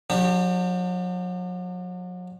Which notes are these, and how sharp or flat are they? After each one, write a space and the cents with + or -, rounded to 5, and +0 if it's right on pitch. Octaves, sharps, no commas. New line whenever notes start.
F#3 -40 D4 +40 G4 +0